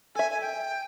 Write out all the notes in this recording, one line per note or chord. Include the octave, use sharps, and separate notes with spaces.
A4 E5 G#5
G#5
G5